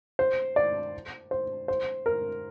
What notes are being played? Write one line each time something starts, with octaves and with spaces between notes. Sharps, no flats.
C5
D5
C5
C5
A#4